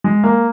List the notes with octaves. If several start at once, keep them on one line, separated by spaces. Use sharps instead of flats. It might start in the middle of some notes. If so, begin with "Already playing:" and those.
G#3
A#3